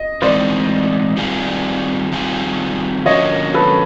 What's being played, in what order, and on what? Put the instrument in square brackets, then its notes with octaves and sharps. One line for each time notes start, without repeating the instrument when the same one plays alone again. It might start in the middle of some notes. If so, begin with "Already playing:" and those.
Already playing: [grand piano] D#5
[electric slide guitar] E3 G#3 C4 D#4 [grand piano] C5 D5
[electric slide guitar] D#3 G3 C4 F4 G#4
D#3 G3 C4 F4 G#4
[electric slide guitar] D3 F3 A#3 C#4 F#4 [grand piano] C#5 D#5
[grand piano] A4 B4